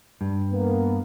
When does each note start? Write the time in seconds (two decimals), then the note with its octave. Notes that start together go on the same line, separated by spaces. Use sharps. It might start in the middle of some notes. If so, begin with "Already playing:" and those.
0.21 G2
0.51 A#3 B3